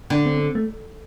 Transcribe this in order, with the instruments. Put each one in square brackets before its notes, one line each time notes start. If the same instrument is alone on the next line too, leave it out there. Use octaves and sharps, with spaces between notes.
[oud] D3 [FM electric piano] D4
[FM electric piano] C4
C4
A3